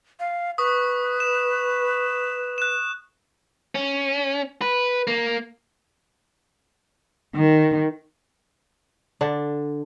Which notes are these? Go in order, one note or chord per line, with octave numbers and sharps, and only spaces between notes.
F5
B4 C#6 D#6
E7
F#6 E7
C#4
B4
A#3
D#3
D3 D4